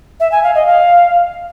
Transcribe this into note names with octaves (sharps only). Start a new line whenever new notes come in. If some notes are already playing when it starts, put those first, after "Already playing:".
E5
G#5
F5
D#5
F5